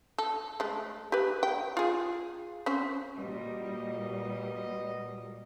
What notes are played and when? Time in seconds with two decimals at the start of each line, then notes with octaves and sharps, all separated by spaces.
0.18 A4
0.60 G#3 A3
1.12 G4 B4
1.43 G5
1.77 F4 G#4
2.66 C4 C#4
3.18 A#2 G3 F#4 B4 D#5